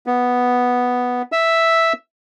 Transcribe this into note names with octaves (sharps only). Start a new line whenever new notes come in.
B3
E5 E6